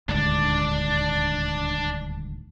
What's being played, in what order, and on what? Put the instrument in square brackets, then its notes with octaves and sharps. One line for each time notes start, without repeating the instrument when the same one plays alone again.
[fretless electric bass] D#1 D2 G#2 [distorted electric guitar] D4 D5